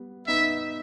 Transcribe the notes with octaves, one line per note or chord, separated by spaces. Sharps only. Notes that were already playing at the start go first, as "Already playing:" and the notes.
Already playing: G3 B3
B3 D#4 E5